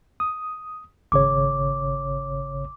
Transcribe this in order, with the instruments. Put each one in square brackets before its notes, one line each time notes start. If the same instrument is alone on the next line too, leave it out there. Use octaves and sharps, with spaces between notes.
[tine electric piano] D#6
[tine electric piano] G#1 C#3 C#5 [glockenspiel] D6